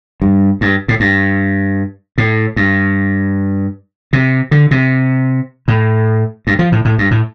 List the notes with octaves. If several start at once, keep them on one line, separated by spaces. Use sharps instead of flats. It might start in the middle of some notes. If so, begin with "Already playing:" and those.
G2
G2
A2
G2
A2
G2
C3
D3
C3
A2
G2
F3
A2
A2
G2
A2